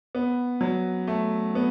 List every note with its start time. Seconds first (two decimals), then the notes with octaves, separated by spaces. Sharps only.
0.15 B3
0.61 F#3
1.07 A3
1.55 B3